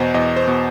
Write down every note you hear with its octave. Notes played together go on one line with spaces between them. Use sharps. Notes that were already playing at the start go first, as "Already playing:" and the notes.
Already playing: E2 B2 C5 D#5
E2 D#5
C5
B2